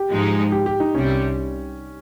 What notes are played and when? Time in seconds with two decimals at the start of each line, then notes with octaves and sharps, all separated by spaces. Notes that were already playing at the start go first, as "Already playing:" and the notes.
Already playing: G4
0.11 G#2 F3 G#3 D#4
0.52 G4
0.66 G4
0.80 D#4
0.94 C2 C3 G3 C#4